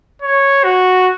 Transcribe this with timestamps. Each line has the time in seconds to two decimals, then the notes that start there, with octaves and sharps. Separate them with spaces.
0.22 C#5
0.64 F#4